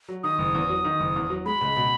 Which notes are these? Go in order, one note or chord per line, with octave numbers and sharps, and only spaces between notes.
F#3
D#3 D#6
F#1
E2
F#3
D#3
F#1
E2
F#3
G#3 B5
C#2
B2